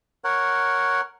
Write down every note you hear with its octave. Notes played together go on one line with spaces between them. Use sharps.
A#4 C#5 F#5